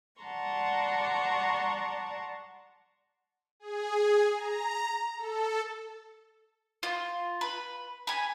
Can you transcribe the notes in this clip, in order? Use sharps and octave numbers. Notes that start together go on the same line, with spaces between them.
D5 F#5 A5 A#5 C6 C#6
G#4
A#5
A4
F4
B4
G#5 B5